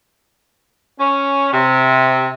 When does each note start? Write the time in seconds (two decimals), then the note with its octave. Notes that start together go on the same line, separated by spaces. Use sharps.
1.00 C#4
1.53 C3